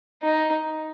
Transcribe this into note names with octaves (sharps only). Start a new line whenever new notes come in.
D#4